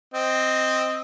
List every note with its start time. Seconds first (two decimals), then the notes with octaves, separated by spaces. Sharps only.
0.14 C4 D#5